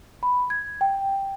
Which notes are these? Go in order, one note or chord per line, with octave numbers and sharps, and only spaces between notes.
B5
G#6
G5